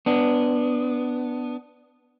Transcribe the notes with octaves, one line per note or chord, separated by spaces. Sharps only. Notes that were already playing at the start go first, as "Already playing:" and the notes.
B3 D4